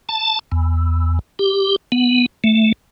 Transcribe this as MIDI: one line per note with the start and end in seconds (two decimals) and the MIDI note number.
0.09 0.39 81
0.52 1.19 40
1.39 1.76 67
1.92 2.26 59
2.44 2.72 57